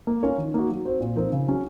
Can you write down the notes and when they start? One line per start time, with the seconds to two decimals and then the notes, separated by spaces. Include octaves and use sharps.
0.07 A#3
0.23 C#4 F4 A#4 C#5
0.38 D#3
0.54 A#3 D#4 F#4
0.70 F#3
0.85 C4 F#4 C5
1.00 A#2
1.15 F3 C4 D#4 A#4
1.32 C#3
1.47 F#3 C#4 G#4